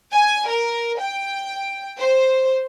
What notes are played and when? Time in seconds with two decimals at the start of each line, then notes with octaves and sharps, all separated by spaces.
0.13 G#5
0.47 A#4
1.00 G5
1.99 C5